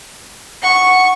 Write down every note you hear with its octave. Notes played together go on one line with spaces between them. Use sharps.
F#5 C#6